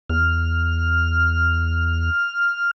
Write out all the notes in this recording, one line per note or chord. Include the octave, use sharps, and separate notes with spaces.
E2 F6